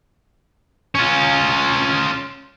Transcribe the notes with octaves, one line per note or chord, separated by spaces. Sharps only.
C#4 F4